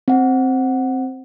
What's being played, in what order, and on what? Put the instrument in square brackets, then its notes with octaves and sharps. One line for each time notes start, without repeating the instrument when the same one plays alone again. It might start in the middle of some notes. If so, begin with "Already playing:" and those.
[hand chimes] C4 F#5